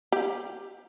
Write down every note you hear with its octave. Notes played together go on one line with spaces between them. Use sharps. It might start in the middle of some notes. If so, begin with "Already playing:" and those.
G4